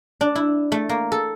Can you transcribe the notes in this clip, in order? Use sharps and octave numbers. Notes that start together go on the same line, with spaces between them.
D4
E4
A3
A#3
A4